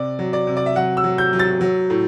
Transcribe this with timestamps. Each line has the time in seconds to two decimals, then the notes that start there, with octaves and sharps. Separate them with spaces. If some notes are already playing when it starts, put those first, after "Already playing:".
Already playing: C3 D5
0.19 F#3
0.33 D5
0.47 C3
0.57 D5
0.66 E5
0.75 F#3 F#5
0.97 E6
1.04 F#3
1.18 G6
1.33 F#3
1.39 A6
1.61 F#3
1.90 A2